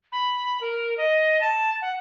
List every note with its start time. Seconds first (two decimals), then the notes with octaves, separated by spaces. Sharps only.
0.12 B5
0.61 A#4
0.98 D#5
1.41 A5
1.82 F#5